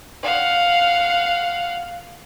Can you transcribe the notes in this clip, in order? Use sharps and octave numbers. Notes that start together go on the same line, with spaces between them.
F5 F#5